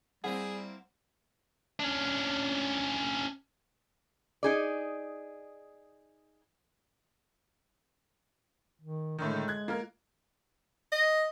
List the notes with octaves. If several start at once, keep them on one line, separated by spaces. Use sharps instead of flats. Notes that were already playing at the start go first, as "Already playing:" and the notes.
G3 A#3 C4 E4 G#4 F#5
C#4 D4
D#4 G#4 D5
D#3
A2 D3 D#3 G#3
F#6 G#6
A#3 F4 A#4
D#5